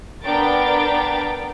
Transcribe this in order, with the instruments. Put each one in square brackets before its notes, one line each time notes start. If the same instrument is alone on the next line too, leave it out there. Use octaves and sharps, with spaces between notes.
[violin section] B3 D4 A#4 G5 A6 D7